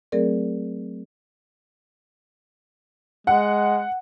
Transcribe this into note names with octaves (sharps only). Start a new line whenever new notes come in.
F#3 A3 C4 G#4 A#4 D5
G#3 F#5